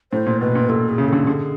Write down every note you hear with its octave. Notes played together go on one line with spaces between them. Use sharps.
A2 C5
A#2
B2 B4
A#2
A#2 A4
G#4
C#3
D3 A4
D3 G#4